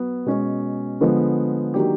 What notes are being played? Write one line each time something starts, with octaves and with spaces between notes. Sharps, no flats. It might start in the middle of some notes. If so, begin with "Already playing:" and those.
Already playing: F#3 B3
B2 G#3 C#4
D3 F3 G#3 B3
D#3 F#3 A#3 D4 G4